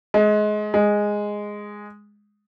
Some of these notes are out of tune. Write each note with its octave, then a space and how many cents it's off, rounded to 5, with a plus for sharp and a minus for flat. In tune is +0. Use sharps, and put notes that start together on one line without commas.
G#3 +25
G#3 -5